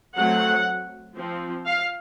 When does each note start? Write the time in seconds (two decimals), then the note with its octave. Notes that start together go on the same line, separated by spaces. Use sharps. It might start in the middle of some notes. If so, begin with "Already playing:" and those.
0.16 F#3 A3 C4 F#5
1.17 F3 C4
1.66 F5